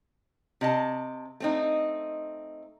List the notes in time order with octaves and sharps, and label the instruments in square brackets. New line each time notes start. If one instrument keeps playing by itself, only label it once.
[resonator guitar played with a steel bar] C3 D#5 A5
A3 C4 D#4